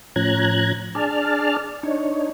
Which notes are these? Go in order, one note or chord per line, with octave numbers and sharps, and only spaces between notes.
A2 F3 C#4 A#5 F#6 G#6
D4 G#4 D5 A5 F6
D4 D#4 C#5